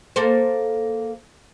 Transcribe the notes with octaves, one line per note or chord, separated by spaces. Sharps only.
A#3 A4 C5